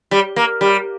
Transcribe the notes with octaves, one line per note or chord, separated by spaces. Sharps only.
G3
A#3
G3